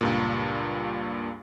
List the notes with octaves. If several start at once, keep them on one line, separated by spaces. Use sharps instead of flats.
C#2 G2 A#2